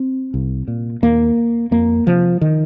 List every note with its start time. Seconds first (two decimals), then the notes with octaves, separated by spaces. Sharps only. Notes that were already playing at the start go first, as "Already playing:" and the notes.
Already playing: C4
0.34 C2
0.68 A#2
1.02 D#2 A#3
1.71 F2 A#3
2.06 C3 F3
2.41 D#3